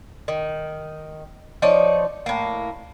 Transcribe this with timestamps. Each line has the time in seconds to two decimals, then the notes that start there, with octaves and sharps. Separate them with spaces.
0.28 D#3
1.62 F3 D#4 C#5 D5
2.26 A2 A#3